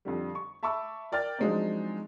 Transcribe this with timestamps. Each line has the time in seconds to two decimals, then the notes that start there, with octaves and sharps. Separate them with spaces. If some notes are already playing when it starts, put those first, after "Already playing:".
0.05 F2 D3 G3
0.35 C#6
0.63 E5 A5 B5 C#6 D6 E6
1.12 A#4 D5 G5 F6 A6
1.38 F3 F#3 G#3 C4 D4 D#4